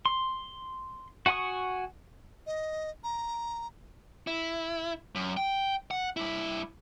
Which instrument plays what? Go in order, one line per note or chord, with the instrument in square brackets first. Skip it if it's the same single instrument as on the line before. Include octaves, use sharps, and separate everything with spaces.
[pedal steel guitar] C6
F#4 F#5 G#5 C#6 D#6
[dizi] D#5
A#5
[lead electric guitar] E4
F#2
G5
F#5
G2 E4